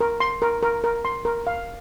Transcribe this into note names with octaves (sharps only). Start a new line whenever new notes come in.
A#4
C6
A#4
A#4
A#4
C6
A#4
F5